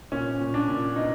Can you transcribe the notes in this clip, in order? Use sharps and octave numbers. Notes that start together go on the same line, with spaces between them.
A#2 C#4
A#2
D4
A#2
B2 D#4